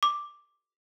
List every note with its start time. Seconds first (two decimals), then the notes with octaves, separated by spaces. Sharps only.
0.03 D6